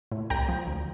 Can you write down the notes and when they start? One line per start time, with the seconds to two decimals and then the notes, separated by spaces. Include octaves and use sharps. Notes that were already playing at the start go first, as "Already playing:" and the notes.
0.12 A2
0.30 C2 G5 A#5
0.49 F3
0.67 D2